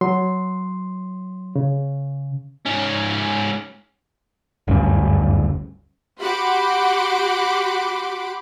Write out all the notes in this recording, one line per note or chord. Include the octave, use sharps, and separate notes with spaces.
F#3 C6
C#3
G#2 C#4
F#1 D2 G2 C#4
F#4 G4 F#5 B5 C6 D6